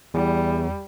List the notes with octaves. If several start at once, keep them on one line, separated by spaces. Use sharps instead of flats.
E2 G3